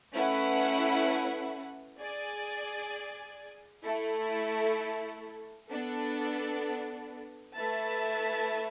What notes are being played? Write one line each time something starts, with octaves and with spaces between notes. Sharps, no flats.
A3 C#4 E4 B4 F#5
G#4 D5 G#5
A3 E4 A4
B3 D4 A4
A3 E4 B4 E5 A5